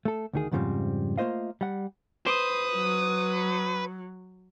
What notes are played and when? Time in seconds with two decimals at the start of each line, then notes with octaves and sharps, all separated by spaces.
0.05 A3 A4
0.33 D2 D#3 G#4
0.52 F2 G#2 C#3 F3 G3 C4
1.18 A3 A#3 F4 C5 D#5 F5
1.61 G3 F#5
2.26 B4 C5 D#6
2.75 F#3